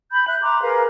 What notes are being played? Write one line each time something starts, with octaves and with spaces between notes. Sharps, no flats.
B5 G6
E5 F#6
A#5 C6 D6
G#4 A#4 B4 F5